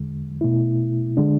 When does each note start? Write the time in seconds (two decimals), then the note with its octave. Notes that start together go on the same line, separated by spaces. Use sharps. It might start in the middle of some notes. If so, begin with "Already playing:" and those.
Already playing: E2 D3 G#3
0.41 B2 A3 E4
1.17 D3 G#3 D4